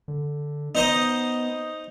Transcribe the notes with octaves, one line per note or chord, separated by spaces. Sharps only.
D3
B3 D#4 C5 D#5